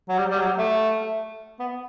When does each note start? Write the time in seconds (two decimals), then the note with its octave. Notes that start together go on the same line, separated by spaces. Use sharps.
0.09 F#3
0.18 G3
0.31 G3
0.39 F#3
0.58 A3
1.59 B3